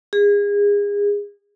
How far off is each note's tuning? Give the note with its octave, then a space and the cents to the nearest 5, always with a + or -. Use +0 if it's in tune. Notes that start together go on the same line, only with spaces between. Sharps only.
G#4 -30